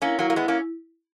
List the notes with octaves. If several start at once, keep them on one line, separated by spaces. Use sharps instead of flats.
A#3 C#4 E4
F#3 A#3 E4
A#3
G#3 B3 E4
A#3 C#4